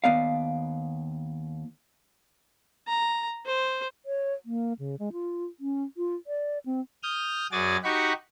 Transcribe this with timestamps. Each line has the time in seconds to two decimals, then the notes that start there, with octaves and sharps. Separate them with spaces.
0.04 D#2 B3 D5 F5
2.87 A#5
3.46 C5
4.06 C#5
4.45 A#3
4.79 C#3
4.99 G#3
5.13 F4
5.60 C#4
5.97 F4
6.27 D5
6.66 C4
7.03 D#6 F6 G6
7.52 F#2 F#4 G#4 D5 G#5 A6
7.84 D#4 F#4 G4 F#5 B5 C#6